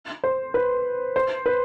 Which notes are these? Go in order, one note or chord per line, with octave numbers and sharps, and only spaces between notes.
C5
B4
C5
B4